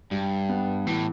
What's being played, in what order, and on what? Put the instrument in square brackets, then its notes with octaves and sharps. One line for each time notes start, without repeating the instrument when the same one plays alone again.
[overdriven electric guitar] G2 [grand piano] G3
[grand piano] B3
[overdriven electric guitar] A2 [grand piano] E3